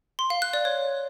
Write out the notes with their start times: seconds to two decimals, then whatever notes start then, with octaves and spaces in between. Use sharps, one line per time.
0.19 C6
0.30 F5
0.42 F#6
0.54 D5
0.65 C#5